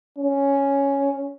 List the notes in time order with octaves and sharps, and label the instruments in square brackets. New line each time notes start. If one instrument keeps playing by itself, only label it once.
[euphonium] C#4